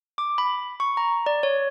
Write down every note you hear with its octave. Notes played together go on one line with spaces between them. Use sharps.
D6
B5
C#6
A#5
D5
C#5